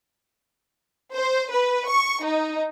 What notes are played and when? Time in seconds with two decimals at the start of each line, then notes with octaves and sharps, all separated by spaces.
1.14 C5
1.51 B4
1.87 C#6
2.23 D#4